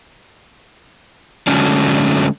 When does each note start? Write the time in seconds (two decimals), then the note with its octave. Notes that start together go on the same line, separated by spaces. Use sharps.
1.47 D3 F#3 G#3 A3 C#4 D4